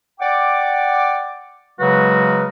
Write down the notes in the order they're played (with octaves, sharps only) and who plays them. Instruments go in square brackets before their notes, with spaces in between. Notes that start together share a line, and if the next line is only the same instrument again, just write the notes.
[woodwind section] D5 F#5 G5 D6
C#3 F#3 G#3 A#3 F#4 B4